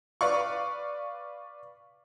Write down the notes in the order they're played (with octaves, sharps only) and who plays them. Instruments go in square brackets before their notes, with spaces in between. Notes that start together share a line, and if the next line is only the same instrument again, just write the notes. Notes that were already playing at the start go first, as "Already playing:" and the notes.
[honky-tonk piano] B4 D5 F5 C#6